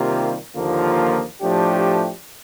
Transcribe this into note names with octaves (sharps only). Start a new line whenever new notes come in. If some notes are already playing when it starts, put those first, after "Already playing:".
Already playing: C3 D#3 G3 A#3 F4
D#2 D3 F3 A#3 F4
A2 F3 A3 D4 G4